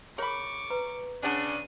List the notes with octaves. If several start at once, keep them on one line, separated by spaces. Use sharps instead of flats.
G#4 A#4 C#5 B5 C#6 D6
B4 A#5
C#3 C#4 D4 F#5 A5 D#7